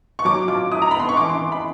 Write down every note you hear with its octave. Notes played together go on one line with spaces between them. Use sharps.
C#6
F#3 D6
F4 D6
E4 D#6
A#5
B5
B3 C6
C#6
E3 D6
C6
E3
B5